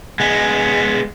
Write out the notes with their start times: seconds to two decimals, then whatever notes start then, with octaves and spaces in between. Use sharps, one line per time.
0.20 G#3 B3